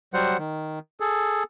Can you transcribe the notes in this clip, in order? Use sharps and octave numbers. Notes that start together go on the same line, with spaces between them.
F#3 G3 C5 F#5
D#3
G#4 A4